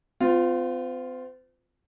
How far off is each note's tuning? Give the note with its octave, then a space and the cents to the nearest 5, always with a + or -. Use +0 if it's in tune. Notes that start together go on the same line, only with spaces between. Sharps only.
C4 -40 F4 +5